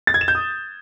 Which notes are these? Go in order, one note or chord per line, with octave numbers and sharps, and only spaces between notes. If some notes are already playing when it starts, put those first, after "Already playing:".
A6
G#6
E7
G6
D#6